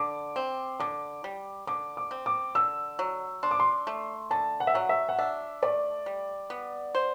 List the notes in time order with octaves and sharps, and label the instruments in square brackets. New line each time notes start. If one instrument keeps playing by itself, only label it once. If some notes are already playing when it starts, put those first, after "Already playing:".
Already playing: [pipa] D3 [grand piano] D6
[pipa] C4
[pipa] D3 [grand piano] D6
[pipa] G3
[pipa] D3 [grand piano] D6
[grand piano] D6
[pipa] C4
[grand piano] D6
[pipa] D3 [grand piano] E6
[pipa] F#3
[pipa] D4 [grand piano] C6
[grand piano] D6
C6
[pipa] A3
[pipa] D3 [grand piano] A5
[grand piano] F#5
E5
[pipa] F#3 [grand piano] F#5
[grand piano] E5
F#5
[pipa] D4 [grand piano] E5
[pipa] A3 [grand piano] D5
[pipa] G3
B3
C5